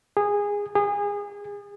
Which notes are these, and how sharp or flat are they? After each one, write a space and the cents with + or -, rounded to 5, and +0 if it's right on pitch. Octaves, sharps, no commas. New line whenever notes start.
G#4 -15
G#4 -25